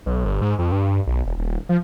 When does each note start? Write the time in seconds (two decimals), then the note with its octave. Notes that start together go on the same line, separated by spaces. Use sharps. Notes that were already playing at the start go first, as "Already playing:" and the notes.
0.06 B1
0.25 G1
0.42 G#2
0.59 F2
0.72 G2
1.07 B1
1.26 E1
1.38 D#1
1.69 F3